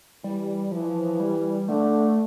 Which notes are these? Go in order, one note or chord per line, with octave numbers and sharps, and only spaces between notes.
E3 G3
E3 F3
G3
D3 A3